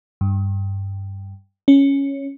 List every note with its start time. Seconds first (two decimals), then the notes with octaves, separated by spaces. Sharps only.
0.21 G2
1.68 C#4